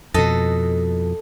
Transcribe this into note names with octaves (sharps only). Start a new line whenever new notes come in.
F2 B2 A4 D#5